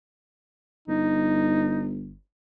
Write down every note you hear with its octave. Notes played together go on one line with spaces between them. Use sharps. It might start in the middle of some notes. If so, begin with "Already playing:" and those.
G1 D#4